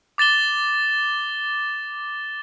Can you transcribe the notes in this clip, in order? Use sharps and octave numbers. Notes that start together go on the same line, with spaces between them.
D6 A6 E7 G7